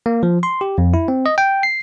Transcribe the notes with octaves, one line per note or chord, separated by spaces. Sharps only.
A#3
F3
C6
G4
F2
E4
C4
D#5
G5
C7